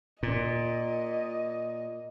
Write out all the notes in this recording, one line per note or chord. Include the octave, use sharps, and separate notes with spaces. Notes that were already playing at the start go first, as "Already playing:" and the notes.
A#2 D#5